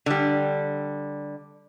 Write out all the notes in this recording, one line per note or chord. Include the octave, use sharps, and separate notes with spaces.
D3 G3